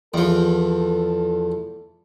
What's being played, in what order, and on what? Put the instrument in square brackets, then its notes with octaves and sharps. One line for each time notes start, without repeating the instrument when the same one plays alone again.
[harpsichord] E2 F3 [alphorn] A4